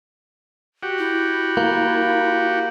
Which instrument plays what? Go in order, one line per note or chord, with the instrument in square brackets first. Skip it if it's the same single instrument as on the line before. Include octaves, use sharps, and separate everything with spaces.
[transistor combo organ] F#4 G4
[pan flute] E4
[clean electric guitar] A#3